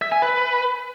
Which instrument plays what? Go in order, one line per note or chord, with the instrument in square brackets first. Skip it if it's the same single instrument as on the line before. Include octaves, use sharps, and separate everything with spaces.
[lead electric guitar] E5
G#5
B4